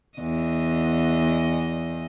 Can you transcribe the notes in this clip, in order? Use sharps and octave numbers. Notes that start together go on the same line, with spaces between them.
E2 D#5